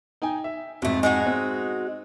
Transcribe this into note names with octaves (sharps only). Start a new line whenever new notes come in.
D#4 G5 G#5
E5
F2 G#2 B2 A3
G#3 D#4 F#4
C4